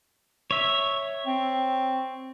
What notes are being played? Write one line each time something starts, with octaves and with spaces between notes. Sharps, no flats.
C#5 E5
C4